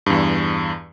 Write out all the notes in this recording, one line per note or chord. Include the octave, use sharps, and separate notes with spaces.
E2 G2